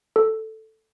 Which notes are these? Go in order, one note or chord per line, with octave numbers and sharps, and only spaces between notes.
A4